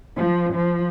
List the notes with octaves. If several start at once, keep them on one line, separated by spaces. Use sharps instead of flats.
F3
F3